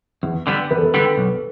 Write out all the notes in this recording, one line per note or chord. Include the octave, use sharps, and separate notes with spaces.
E2
D3 G3 B3
E2 B4
A4
B4
D3 G3 B3
B1